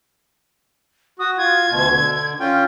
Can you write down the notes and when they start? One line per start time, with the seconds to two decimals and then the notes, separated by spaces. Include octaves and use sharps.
1.19 F#4 D#6
1.38 F4 G#6
1.70 D2 B2
1.89 D3
2.40 C#4 F4 G5